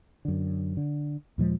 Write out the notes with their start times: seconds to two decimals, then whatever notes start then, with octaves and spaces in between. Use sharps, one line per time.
0.25 F#2 D3
0.77 D3
1.38 D#2 A#2 F3 G#3